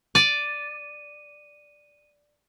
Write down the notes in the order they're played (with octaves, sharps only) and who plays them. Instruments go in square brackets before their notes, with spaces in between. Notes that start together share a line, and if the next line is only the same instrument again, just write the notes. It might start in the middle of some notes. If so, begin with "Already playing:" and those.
[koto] D5 [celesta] D#7